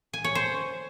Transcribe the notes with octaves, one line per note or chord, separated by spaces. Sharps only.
G#5
C#5
C5